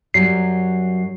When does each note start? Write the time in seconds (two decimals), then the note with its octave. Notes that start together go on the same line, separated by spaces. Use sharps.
0.14 F#2 F#3 G3 C7